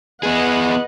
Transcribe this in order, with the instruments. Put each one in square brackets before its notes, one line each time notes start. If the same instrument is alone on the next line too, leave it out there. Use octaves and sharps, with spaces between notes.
[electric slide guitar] B3 G#4 [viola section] B4 D#5 F#5